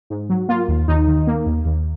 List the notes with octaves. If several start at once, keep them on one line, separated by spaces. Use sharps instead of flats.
G#2
F#3
A#3 F4
D#2
D#2 D#4
D#3
A#3
D#2
D#2